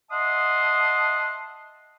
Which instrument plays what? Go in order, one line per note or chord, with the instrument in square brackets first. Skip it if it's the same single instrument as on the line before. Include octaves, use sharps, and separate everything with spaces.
[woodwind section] D#5 E5 F#5 A5 C6 D#6